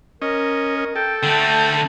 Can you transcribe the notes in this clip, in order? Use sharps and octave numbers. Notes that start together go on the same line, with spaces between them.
C#4 A#4 D#5
A#4
A4 G5
D3 A3 G5